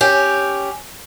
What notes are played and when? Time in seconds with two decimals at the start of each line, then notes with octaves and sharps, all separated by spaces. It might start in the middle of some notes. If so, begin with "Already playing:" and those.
0.01 C#4 G4